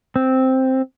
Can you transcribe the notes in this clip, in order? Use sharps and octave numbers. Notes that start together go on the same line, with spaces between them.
C4